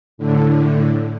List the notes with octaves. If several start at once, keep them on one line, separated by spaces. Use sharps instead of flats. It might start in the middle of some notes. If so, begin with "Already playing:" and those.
A2 D3